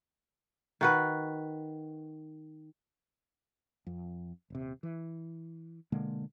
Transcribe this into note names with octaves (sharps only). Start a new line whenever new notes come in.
D#3 F#4 B4
F2
D#1 C3
E3
B2 D3 G#3 A#3